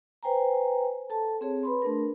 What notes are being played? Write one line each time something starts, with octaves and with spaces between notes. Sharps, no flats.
B4 C5 G5 G#5 A#5
A4 A5
C4 G#4 C#5
B4 B5 C6
A3 D4 A#4